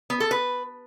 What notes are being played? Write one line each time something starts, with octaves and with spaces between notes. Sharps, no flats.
B3
A4
B4